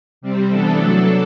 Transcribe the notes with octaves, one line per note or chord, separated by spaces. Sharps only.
C3 G3 C4
C3 E3 B3 D4 A4
C3 F#3 A3 D4